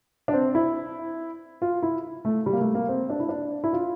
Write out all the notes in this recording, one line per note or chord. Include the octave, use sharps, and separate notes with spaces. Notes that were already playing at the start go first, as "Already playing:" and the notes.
D4
C4
E4
F4
E4
A3
G3
A#3
A3
A#3
C4
D4
E4
D4
E4
F4